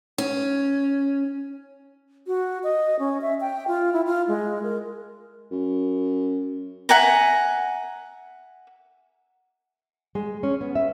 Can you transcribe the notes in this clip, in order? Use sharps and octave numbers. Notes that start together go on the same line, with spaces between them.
C#4
F#4
D#5
C#4
E5
G5
F4
E4
F4
G#3
A#4
F#2
E5 F#5 G#5 A#5
G#3
C#4
B3
E5